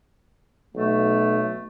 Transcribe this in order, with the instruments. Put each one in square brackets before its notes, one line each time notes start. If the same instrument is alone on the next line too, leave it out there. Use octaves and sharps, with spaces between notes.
[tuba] B1 [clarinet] A3